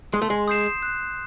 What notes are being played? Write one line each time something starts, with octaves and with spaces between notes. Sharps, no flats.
G#3 C6
A3
G#3
D#6 G6 C7 E7
F#6